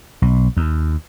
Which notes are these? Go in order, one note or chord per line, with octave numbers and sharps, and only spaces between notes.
B1
D#2